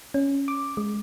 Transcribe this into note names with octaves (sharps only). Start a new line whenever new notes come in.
C#4
D6
G#3